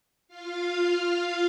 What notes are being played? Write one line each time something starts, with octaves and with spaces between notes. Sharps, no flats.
F4 F5